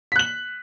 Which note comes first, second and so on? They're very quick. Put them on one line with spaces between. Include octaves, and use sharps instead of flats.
B6 F#6 F#7